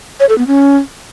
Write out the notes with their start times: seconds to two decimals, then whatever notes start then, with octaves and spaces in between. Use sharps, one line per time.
0.20 C#5
0.29 A4
0.38 B3
0.47 C#4